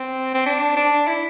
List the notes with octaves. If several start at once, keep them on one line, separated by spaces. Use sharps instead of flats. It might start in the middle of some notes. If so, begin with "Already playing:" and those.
Already playing: C4
C4
D4
D4
E4